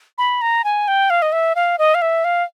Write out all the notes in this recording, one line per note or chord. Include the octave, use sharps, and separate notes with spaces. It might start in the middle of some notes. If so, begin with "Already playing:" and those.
B5
A#5
G#5
G5
F5
D#5
E5
F5
D#5
F5
E5
F5